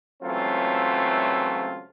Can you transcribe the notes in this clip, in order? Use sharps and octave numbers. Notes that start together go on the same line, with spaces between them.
C#2 E3 F#3 A3 C4 F4